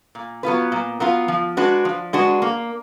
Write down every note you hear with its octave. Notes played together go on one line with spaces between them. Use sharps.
A#2
F#3 B3 F4 B4
A#2
F#3 B3 F4 B4
F3
G#3 D4 F#4 B4
F3
G#3 D4 F#4 B4
A#3